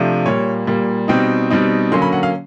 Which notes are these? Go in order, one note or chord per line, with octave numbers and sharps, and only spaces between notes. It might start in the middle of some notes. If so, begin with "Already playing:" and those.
Already playing: C3 F3 A3 D4
A#2 G3 A#3 C#5
A#2 G3 A#3
B2 G3 C4 D#4 G5
B2 G3 C4 D#4
D3 F#3 A#3 C#4 C6
B5
F#5
F5